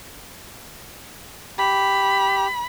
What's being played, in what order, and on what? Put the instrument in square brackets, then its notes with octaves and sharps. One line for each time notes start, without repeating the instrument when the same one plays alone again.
[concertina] G4 [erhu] B5